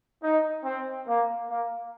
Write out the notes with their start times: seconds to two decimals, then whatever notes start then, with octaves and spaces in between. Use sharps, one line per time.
0.23 D#4
0.64 C4
1.06 A#3
1.49 A#3